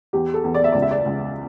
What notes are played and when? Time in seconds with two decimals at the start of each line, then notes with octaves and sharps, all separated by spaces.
0.13 E2 G4
0.34 A4
0.44 E2
0.54 D5
0.64 E5
0.72 C#2 D5
0.82 E5
0.91 D5
1.06 C#2